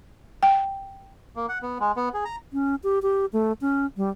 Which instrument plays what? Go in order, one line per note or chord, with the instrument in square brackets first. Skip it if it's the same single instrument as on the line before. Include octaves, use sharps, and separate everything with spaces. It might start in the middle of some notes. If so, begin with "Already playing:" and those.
[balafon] G5
[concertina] A#3
F#5
B3
G#3
B3
G#4
A#5
[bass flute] C#4
G4
G4
A3
C#4
G3